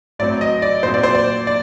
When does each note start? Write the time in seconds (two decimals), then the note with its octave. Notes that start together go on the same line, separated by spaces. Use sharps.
0.19 A2 F#3 C4 D5
0.41 D#5
0.62 D5
0.83 A#2 F#3 C4 C5
0.94 D5
1.03 C5
1.15 D5
1.47 D5